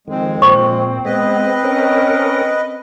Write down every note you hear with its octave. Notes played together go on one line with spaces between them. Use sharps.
F2 D#3 G#3 C4
A#2 C5 C#6
G#3 B3 B4 D#5
C#4 A#4